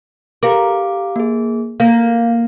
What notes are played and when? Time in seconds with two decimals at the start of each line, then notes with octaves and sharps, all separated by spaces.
0.43 G4 A#4 F5 D6
1.16 A#3 G#4
1.80 A#3 F5 G6